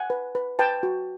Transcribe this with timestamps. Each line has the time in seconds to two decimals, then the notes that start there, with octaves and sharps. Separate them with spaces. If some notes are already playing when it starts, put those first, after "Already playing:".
Already playing: F#5 G#5
0.10 B4
0.35 B4
0.59 B4 G5 A5
0.83 F#4